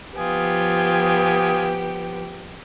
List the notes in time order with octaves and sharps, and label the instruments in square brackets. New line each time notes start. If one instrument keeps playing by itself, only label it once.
[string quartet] F3 B3 G5 [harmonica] F4 G#5 D#6 [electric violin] G4